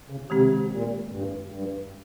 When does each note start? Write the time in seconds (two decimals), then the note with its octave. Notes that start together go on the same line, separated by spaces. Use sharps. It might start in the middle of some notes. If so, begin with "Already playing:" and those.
0.10 C#3
0.30 C3 D#3 G#3 C4 G4
0.71 A#2
1.11 G2
1.52 G2